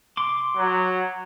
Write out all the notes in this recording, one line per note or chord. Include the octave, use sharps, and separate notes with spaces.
C6 D6
F#3